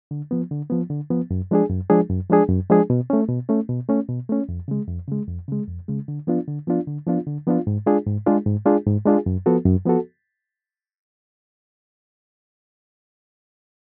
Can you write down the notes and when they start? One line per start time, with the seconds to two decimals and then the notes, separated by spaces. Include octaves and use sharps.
0.11 D3
0.31 F3 B3
0.51 D3
0.70 F3 B3
0.90 D3
1.10 F3 B3
1.31 F#2
1.51 F3 G#3 D4 G#4
1.70 F#2
1.90 F3 G#3 D4 G#4
2.09 F#2
2.30 F3 G#3 D4 G#4
2.49 F#2
2.70 F3 G#3 D4 G#4
2.90 B2
3.10 A3 C#4
3.29 B2
3.49 A3 C#4
3.69 B2
3.89 A3 C#4
4.09 B2
4.29 A3 C#4
4.49 F2
4.68 C#3 G#3
4.88 F2
5.08 C#3 G#3
5.28 F2
5.48 C#3 G#3
5.68 F2
5.88 C#3 G#3
6.08 D3
6.27 F3 B3 D4 F4
6.48 D3
6.67 F3 B3 D4 F4
6.87 D3
7.06 F3 B3 D4 F4
7.27 D3
7.47 F3 B3 D4 F4
7.67 G#2
7.86 G#3 D4 F4 G#4
8.06 G#2
8.26 G#3 D4 F4 G#4
8.46 G#2
8.66 G#3 D4 F4 G#4
8.86 G#2
9.05 G#3 D4 F4 G#4
9.26 F#2
9.46 F3 B3 F#4 A4
9.66 F#2
9.85 F3 B3 F#4 A4